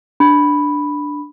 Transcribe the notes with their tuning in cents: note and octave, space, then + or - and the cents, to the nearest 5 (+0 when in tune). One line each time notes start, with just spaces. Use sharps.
D4 +0 B5 +0